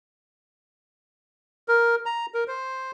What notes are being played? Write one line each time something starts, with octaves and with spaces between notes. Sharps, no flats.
A#4
A#5
A#4
C5